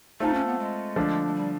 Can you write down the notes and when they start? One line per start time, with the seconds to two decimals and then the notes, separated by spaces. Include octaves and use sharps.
0.20 A3 C4 D#4 F4 A4
0.33 C#4
0.46 B3
0.58 G#3
0.96 D3 F3 A3 D4
1.26 G#3
1.33 G3